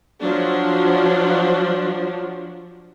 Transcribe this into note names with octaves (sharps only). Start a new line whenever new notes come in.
F3 F#3 D4